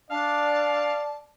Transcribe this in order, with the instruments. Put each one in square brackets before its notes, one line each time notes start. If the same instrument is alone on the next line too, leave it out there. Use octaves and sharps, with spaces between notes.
[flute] D4 [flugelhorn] D5 [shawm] F5 [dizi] A5